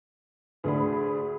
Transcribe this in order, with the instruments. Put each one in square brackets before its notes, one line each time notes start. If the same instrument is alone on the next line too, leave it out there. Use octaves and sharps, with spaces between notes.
[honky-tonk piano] D2 D4 B5 [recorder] G#4